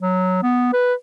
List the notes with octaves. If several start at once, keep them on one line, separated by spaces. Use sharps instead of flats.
F#3
B3
B4